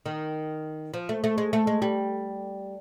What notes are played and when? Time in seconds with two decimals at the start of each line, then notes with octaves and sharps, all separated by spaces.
0.06 D#3
0.94 F3
1.09 A3
1.24 A3
1.38 G#3
1.53 A3
1.67 G#3
1.82 G3